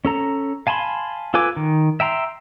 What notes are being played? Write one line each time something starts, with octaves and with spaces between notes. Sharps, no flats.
C#4 A4 A#5
F5 G#5 A5 B5 C6
F4 A4 B4 G#5 D6
D#3
E5 G5 A#5 C6